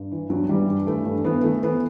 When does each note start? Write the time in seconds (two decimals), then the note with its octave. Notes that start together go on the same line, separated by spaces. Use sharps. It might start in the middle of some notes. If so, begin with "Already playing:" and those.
Already playing: G2
0.12 E3
0.30 G2 F#3
0.49 E3 G3
0.68 G2
0.86 E3 A3
1.06 G2
1.24 E3 B3
1.44 E3 A3
1.62 E3 B3